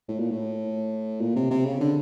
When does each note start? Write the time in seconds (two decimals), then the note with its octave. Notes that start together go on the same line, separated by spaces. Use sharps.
0.08 A2
0.19 A#2
0.31 A2
1.21 A#2
1.36 C3
1.50 C3
1.66 C#3
1.81 D3